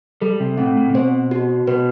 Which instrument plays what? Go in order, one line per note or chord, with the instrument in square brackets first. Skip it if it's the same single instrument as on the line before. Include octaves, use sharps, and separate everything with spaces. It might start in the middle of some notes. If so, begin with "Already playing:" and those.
[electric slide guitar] G3 [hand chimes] A4
[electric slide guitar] C3
[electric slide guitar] A2 [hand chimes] C4
[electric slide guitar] A2
C3
[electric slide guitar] B2 [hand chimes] C5
[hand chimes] F#4
[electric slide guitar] B2 [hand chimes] B4